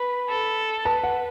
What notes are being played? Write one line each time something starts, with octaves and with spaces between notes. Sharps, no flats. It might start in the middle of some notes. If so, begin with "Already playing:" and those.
Already playing: B4 B5
A4
B4 A5
F#5